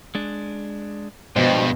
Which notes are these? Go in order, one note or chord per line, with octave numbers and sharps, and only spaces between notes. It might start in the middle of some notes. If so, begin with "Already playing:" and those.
G#3 D4
G2 B2 F3 G3 G#3 C5 D#5